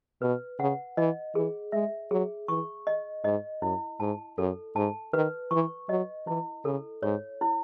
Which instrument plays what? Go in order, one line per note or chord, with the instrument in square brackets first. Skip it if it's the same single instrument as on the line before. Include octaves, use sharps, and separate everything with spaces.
[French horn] B2 [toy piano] B4
[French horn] C#3 [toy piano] F#5
[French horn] E3 [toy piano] D#5
[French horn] E3 [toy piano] G#4
[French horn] G#3 [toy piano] E5
[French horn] F#3 [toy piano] G#4
[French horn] E3 [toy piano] C#6
[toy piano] D#5
[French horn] G#2 [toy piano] D#5
[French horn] F#2 [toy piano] E4
[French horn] G#2 [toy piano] A5
[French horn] F#2 [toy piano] A4
[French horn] G#2 [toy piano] A5
[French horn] D#3 [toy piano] B4
[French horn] E3 [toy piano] C#6
[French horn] F#3 [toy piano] D#5
[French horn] E3 [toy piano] E4
[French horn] C#3 [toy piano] A4
[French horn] G#2 [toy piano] C#5
[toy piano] E4